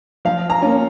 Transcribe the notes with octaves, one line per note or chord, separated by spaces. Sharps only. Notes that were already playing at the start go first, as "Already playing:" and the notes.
F3 F5
A#5
A#3 C#4 F4